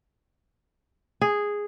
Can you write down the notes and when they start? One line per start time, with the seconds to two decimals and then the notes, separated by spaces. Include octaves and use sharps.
1.21 G#4